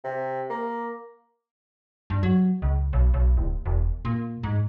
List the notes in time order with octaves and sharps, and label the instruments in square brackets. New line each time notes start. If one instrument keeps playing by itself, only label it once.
[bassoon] C3
A#3
[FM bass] G2
F#3
C#2
B1
B1
D1
E1
A#2
G#2